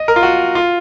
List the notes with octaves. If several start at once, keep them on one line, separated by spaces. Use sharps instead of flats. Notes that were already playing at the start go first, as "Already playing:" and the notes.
Already playing: D#5
A#4
F4
F#4
F4